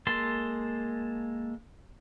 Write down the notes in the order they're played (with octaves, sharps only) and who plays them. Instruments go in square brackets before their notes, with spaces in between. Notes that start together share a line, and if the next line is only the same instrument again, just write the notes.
[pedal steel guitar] G#3 A#3 A4 A5 C6